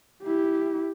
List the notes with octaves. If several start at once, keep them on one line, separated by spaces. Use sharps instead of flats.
E4 G4